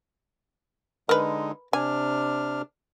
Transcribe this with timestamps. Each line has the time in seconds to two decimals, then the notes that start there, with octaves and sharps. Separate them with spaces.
1.09 D3 G#3 D#4 A#4 B4
1.73 C3 D4 G#5 F6